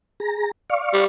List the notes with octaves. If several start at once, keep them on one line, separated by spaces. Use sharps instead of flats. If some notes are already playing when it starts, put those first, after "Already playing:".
G#4 A#5
D5 F5 C#6
G3